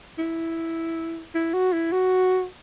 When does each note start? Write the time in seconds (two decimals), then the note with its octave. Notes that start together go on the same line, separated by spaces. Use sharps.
0.18 E4
1.35 E4
1.54 F#4
1.73 E4
1.92 F#4